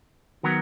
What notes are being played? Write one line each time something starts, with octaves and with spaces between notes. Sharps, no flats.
D#3 F#3 B3 F#4 A#4